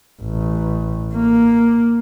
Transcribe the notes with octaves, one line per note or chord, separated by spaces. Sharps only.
A1
A#3